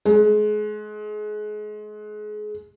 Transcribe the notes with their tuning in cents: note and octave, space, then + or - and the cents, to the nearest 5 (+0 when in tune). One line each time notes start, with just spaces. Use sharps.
G#3 +30